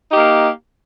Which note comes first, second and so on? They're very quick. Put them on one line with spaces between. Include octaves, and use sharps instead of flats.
D#4 G4 A#3